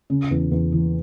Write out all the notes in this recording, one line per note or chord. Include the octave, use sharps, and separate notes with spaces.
C#3
E2
E2
E3